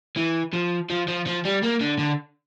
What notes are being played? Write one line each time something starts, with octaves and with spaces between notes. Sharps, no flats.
E3
F3
F3
F3
F3
G3
A#3
D3
D3